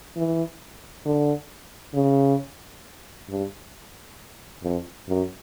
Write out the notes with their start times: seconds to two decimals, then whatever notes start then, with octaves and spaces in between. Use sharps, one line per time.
0.16 E3
1.06 D3
1.94 C#3
3.30 G2
4.63 F2
5.08 F#2